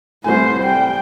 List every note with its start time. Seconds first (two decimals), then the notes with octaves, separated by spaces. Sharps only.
0.24 C2 A3 E4 C5 G#5
0.60 G3 G5